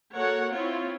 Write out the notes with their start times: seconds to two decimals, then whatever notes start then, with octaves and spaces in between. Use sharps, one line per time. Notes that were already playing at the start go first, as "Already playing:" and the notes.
0.15 A#3 F#4 A4 A#4 C#5 F#5
0.52 C4 E4 F4 C#5